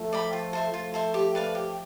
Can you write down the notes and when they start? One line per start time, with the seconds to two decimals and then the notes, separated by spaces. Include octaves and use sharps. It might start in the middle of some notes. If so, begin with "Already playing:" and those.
Already playing: F3 A3
0.13 D5 G5 B5
0.33 F4
0.53 A4 C5 E5
0.73 F3 A3 F4
0.94 A4 C5 E5
1.14 G4
1.35 B4 D5 F5
1.55 G4